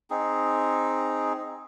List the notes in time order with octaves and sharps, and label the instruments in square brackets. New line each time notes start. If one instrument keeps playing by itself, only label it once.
[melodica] C4 D#4 G#4